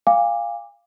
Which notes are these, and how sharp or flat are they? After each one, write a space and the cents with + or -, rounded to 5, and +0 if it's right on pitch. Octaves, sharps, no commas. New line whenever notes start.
F5 +0 G#5 -40 D6 +0